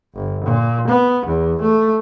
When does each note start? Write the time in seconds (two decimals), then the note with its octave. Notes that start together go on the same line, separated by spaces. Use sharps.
0.15 G1
0.45 A#2
0.88 B3
1.26 E2
1.62 A3